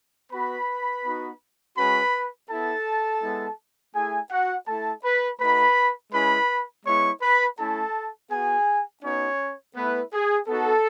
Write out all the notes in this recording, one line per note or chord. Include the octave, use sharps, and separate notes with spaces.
B3 F#4 B4 B5
B3 D#4 F#4
G#3 C#4 F#4 B4 B5
B3 E4 A4 A5
G#3 B3 E4
A3 E4 G#4 G#5
F#4 F#5
A3 E4 A4 A5
B4 B5
A3 D#4 F#4 B4 B5
G#3 C#4 E4 B4 B5
G#3 B3 E4 C#5 C#6
B4 B5
A3 C#4 E4 A4 A5
B3 F#4 G#4 G#5
B3 C#4 D#4 F#4 C#5
A3 B3 E4 B4
G#4
B3 D#4 F#4 A4